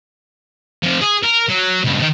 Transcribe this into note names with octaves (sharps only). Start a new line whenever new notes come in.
C3 F3
G#4
A#4
F#3
C#2 G2
A2 D#3